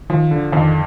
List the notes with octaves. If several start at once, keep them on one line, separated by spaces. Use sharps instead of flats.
D#3 F3
D3
F2 D#3